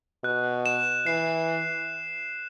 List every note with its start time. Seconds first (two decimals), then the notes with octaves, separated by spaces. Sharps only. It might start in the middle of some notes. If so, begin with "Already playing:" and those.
0.24 B2 F#6
0.66 E7
1.06 E3 C7